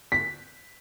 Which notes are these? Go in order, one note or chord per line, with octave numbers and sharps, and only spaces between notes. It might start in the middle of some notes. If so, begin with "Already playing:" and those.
B6